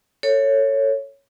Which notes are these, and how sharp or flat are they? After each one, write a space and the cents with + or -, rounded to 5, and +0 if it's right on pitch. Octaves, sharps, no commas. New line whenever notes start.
A4 +25 C#5 +0